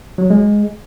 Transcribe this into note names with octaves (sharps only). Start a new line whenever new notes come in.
F#3
G#3